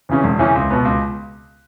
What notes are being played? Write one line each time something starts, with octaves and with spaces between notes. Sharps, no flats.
E2 C#3 E3 C#4
E1
E2 C#3 E3 C#4
C#2
B2 B3
C#2